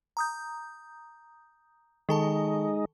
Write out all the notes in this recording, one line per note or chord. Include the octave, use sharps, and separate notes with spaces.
A#5 D#6 G6
D#3 G#3 D#4 A4 A5